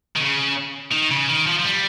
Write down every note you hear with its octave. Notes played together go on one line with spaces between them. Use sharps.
D#3
C#3
D#3
C#3
D#3
F3
F3
G3